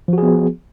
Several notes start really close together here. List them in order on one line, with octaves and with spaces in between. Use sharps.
F3 F#4 G#4 B3